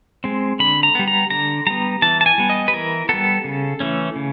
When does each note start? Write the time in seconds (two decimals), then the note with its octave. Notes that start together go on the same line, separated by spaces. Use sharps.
0.24 G#3 C4
0.59 D3 B5
0.83 A#5
0.95 G3 B3
1.08 A#5
1.30 D3 A#5
1.67 G3 B3 A#5
2.02 E3 A5
2.21 A5
2.26 G#5
2.38 G3 B3
2.50 D#5
2.68 B4
2.73 E3 A#4
3.09 G3 B3 A4
3.44 C#3
3.80 E3 A3 C#4
4.16 C#3